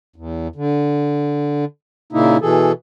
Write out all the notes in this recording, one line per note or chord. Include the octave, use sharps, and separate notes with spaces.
E2
D3
A#2 C#3 A#3 D#4 E4
B2 E3 G#4 A4